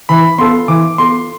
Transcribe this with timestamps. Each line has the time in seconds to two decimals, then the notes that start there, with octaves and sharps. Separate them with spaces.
0.09 E3 B5
0.38 B3 F4 A4 C6
0.68 E3 D6
0.98 B3 F4 A4 C6